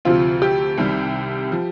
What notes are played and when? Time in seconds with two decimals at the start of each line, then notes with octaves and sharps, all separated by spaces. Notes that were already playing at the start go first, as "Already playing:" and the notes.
0.05 D2 C3 F3 C4 F4
0.42 G4
0.78 C2 C3 D#3 G3
1.52 F3